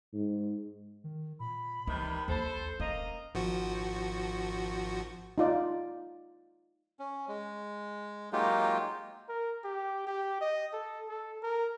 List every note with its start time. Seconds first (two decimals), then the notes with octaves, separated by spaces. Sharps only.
0.14 G#2
1.04 D#3
1.40 A#2 B5
1.87 C#2 C3 D#3 E3 G3
2.28 A#1 D#2 A4 C5
2.80 E1 A#3 C#4 D#5 A#5
3.35 G#1 F3 F#4
5.38 D#4 F4 D5
6.99 C#4
7.28 G#3
8.33 F#3 G#3 A#3 D#4 F4 G4
9.29 A#4
9.64 G4
10.07 G4
10.41 D#5
10.73 A4
11.09 A4
11.43 A#4